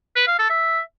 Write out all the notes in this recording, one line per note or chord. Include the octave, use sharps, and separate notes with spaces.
B4
F5
A4
E5